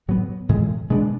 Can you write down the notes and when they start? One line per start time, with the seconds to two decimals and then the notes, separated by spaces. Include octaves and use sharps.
0.08 A2 F#3 B3
0.49 A2 E3 G#3
0.90 B2 G#3 B3 D4